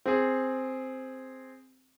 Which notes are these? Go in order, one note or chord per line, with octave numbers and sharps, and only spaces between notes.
C4 G#4